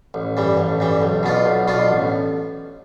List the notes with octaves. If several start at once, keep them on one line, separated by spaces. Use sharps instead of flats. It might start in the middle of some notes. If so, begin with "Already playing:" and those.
A1
G2 E3 G3
A1
G2 E3 G3
B1
B2 B3 D4 F4
B1
B2 B3 D4 F4
A1